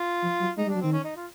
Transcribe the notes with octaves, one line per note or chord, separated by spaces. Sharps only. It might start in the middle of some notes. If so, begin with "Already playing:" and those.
Already playing: F4
F3
F#3
G#3 D#4
G3
D4
F#3
D#3 C4
C#4
D#4
F4